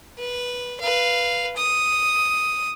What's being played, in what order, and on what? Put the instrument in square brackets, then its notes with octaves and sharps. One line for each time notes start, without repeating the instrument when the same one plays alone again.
[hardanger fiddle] B4
B4 F5
D#6